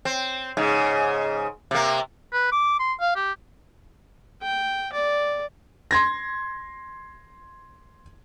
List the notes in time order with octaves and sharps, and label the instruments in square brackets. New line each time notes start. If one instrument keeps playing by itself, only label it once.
[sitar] C4
G#2 C#3
C3 A#3
[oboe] B4
D6
C6
F5
G4
[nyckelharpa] G5
D5
[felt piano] C6 G#6 A#6